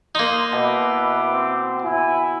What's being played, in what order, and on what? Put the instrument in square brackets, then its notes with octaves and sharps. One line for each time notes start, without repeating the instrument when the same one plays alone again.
[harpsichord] A#3 D#4 [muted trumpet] C6
[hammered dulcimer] B2 [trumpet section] E4 E5 D6 [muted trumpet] B4
[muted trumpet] C4
[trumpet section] E4 [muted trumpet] G#5